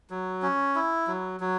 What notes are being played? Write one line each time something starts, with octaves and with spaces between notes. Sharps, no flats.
F#3
C#4
E4
F#3
F#3